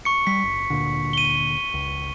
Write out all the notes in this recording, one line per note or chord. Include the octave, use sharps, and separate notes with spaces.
C#6 C#7
G3 B6
F#1
D2 A#2 D3
D#7 G7
C#2